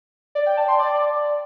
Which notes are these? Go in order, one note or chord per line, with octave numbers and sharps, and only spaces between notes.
D5
G5
A5
C6
D5